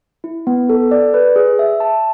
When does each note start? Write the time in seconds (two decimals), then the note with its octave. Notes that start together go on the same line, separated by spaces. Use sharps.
0.24 E4
0.47 B3
0.69 A4
0.91 D5
1.14 B4
1.36 G#4
1.59 E5
1.80 A5